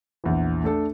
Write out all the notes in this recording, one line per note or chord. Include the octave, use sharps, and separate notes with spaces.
A#1 E2 E3
A3 D4 A4